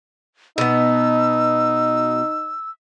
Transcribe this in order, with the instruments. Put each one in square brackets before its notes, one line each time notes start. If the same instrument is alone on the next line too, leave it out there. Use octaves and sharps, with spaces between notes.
[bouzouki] B2 B3 [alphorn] D#4 [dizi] E6